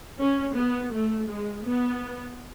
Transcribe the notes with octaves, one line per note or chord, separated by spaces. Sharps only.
C#4
B3
A3
G#3
B3